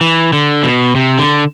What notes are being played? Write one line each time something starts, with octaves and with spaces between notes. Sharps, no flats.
E3
D3
B2
C3
D3